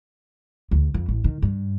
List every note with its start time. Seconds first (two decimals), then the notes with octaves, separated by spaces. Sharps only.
0.71 D2
0.94 F2
1.09 A1
1.24 D#3
1.42 G2